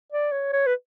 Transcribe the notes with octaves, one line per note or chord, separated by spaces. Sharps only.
D5
C#5
C#5
B4